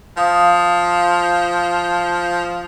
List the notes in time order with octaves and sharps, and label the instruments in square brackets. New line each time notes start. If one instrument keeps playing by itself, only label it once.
[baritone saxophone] F3 [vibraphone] F5 D#6